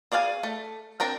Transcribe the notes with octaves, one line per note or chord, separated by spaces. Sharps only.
G#4 D5 F5 F#5 G#5
A3
C4 D4 A#4 G5